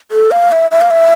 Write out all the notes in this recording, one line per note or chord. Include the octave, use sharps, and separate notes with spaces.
A4
F5
E5
E5
F5
E5